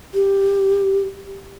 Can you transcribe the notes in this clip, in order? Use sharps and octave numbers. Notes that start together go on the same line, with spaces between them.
G4